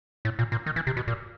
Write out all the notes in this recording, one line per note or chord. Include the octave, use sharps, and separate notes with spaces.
A2
A#2
A#2
D#3
E3
C3
B2
A#2